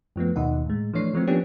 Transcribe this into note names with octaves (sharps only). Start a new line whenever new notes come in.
F#2 F3 A3 B3
D#2 B2 D#3 D#5 F#5
A2 G#3
E3 F3 A3 D4 C#5 C7
E3 F3 A3 C4
F3 A#3 B3 C#4 D4 G4